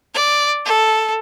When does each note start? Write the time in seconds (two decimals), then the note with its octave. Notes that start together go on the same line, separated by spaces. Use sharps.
0.14 D5
0.66 A4